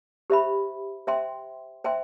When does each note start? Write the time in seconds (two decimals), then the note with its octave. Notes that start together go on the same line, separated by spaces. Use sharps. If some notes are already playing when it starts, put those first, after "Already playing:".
0.30 G4 C5 E5 B5
1.07 C5 E5 G5 C6
1.84 C5 E5 G5 C6